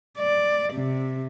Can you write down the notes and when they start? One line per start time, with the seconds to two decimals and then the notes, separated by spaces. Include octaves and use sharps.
0.19 D5
0.74 C3